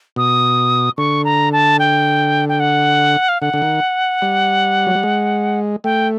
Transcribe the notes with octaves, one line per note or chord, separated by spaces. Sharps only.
B2 D#6
D3 C#6
A#5
A5
G5
G5
F#5
F5
D3 F#5
D3
D#3
G3
F#3
G3
G#3
A3 G5